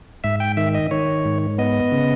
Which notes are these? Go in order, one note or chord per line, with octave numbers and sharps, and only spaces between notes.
G#2 E5
G5
D#3 E5
D#5
D#3 C#5
G#2
B3 D#5
C#3